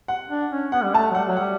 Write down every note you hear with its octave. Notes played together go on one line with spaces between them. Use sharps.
F#5
D4
C#4
B3 F#5
G3
A3 A5
F#3
G3 F#5
F#3
G3 F#5